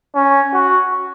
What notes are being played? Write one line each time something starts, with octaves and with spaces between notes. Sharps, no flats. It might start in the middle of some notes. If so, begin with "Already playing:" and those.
C#4
F#4